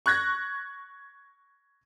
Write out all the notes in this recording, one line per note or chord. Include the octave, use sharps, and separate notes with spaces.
C#6 F#6 G#6 A#6